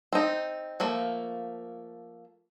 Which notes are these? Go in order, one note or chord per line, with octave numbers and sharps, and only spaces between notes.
C4 D#4
F3 A3 A#3